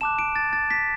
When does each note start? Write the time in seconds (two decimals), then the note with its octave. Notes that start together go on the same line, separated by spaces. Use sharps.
0.01 A5 D6 F#6 E7
0.19 D7
0.36 A6
0.53 A6
0.71 B6